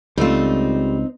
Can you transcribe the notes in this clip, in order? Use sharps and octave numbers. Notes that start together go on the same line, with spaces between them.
C#2 G3 A3 C4 D#4 F4